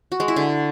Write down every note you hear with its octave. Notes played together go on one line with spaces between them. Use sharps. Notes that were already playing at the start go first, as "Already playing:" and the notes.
F#4
G#3
E4
D3